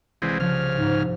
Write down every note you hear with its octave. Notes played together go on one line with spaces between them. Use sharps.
C2 E3 G#3 C4
C#3 F3 F6
G#2